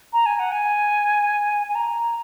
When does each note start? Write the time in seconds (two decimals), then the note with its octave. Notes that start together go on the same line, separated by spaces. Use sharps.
0.13 A#5
0.26 G#5
0.39 F#5
0.52 G#5
1.69 G#5
1.75 A#5